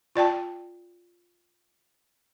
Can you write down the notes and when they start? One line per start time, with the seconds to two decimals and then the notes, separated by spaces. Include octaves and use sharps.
0.16 F4 D5 G5 A5